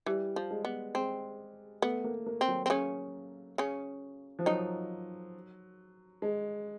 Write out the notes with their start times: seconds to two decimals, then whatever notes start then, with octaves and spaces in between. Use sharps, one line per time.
0.06 E3 G3
0.36 F3
0.51 G#3
0.65 B3
0.94 G#3 C4
1.82 A3 B3
2.04 A#3
2.26 A#3
2.41 C4
2.48 F#3
2.66 C4
2.70 C#3 C#4
3.58 C#3 C#4
4.39 F3
4.46 D#3 F#3 D#4
6.22 G#3